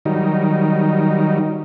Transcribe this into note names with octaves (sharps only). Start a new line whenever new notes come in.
D#3 F#3 G3 D#4